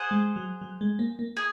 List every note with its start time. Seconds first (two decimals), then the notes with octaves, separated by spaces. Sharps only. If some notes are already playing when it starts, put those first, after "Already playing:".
Already playing: G#4 C5 F#5
0.11 G#3
0.36 F#3
0.61 F#3
0.81 G#3
0.99 A#3
1.19 A#3
1.37 G#4